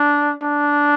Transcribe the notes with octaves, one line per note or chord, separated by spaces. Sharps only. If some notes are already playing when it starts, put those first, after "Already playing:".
Already playing: D4
D4